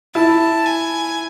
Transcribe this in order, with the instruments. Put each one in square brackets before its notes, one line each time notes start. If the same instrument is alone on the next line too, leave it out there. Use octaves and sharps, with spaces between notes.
[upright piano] E4 [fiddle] A5
[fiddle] G#5